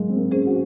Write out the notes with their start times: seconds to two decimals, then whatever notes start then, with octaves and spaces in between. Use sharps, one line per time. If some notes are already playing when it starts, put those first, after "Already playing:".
Already playing: F#3 G#3 A#3
0.09 C4
0.17 A#3
0.31 C#4 G#4 C5
0.46 F#4